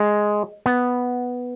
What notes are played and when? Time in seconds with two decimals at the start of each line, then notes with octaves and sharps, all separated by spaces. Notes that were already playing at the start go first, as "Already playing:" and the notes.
Already playing: G#3
0.66 B3